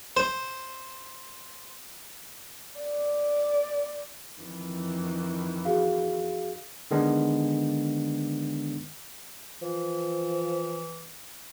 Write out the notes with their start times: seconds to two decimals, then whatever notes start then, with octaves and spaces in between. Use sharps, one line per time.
0.17 C5
2.80 D5
4.40 F2 D#3 E3
5.65 F#4 G#4 F5
6.91 D3 D#3 G#3 B3 D4
9.62 E3 F3